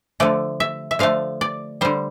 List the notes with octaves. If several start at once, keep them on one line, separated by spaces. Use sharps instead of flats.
D3 F3 A3 D5
E5
E5
D3 F3 A3 F5
D5
D3 G3 C5